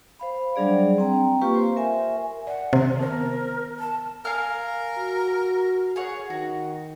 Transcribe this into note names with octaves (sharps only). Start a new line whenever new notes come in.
C5 F5 B5
F#3 G3 D4 G#4 D5
C4 G5 A#5
A#3 F4 G4 B4 F5 C#6
C5 C6
A#4 E5 G#5
D5 F#5
C3 D#3
B3 A#4 C5
A5
A#4 F5 G#5 F6
F#4
G#4 C#5 F#5
D#3 F#4